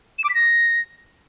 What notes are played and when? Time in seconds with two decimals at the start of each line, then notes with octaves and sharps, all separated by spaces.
0.19 E7
0.24 D6
0.29 B6
0.35 A#6